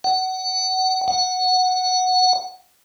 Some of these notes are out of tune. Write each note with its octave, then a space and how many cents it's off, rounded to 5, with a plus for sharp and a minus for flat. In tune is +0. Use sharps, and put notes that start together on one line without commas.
F#5 +25
F#5 -5